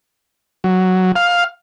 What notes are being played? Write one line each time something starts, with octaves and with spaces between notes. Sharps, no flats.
F#3
F5